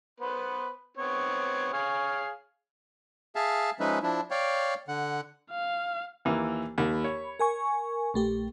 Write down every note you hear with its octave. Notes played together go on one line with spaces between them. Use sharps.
B3 B4 C5
B3 C4 C#5
G#4 C#5 F5
G#4 E5 F5 A5
F3 G#3 C#4 D#4 B4 E5
F3 D4 E4
C#5 D5 F5 G5
D3 F#5
F5
D#2 E3 A#3
D#2 B5
C#5
A#4 G#5 C#6
A#1 A3 G4